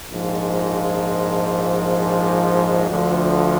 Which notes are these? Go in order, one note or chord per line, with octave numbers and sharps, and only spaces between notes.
A#1 G#2 F3
D2 D3 F3